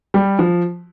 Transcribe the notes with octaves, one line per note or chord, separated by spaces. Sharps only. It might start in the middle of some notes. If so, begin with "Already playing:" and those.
G3
F3